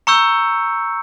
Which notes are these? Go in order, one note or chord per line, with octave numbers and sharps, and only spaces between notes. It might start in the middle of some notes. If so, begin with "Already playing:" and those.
A#5 C#6 E6 G6 C#7